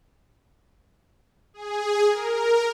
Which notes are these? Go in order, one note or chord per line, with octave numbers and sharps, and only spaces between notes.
G#4
A#4